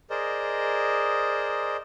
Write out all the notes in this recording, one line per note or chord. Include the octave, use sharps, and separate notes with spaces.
G#4 A#4 C5 D5 D#5